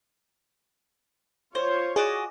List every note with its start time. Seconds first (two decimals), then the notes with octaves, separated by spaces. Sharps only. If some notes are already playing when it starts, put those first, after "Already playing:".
1.55 F4 C5 C#5
1.96 F#4 G#4 D5 D#5